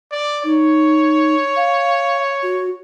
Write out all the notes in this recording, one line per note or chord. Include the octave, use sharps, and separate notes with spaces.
D5
D#4 C#5
F5
F#4